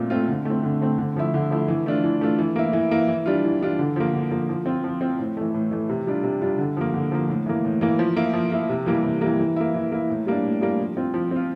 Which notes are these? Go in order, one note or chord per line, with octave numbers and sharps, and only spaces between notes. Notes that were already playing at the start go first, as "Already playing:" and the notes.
Already playing: A#2 A3 C4 F4
A3 C4 F4
D3
A3 C4
D3
A3 C4
D3
F3 A3 E4
D3
F3 A3 E4
E3
A3 D4 F4
E3
A3 D4 F4
E3
A#3 E4
E3
A#3 E4
E3
G3 D4 F4
E3
G3 D4 F4
D3
F3 A#3
D3
F3 A#3
F3
C4 F4
F3
C4 F4
A2
E3 A3
A2
E3 A3
C3
G3 D4 F4
C3
G3 D4 F4
D3
F3 A#3
D3
F3 A#3
A2
E3 A#3
A2
E3 A#3
F3
A#3 E4
F3
A#3 E4
C3
E3 G3 A#3
C3
E3 G3 A#3
E3
A#3 E4
E3
A#3 E4
A2
G3 A#3 D4
A2
G3 A#3 D4
F3
C4 F4
F3
C4 F4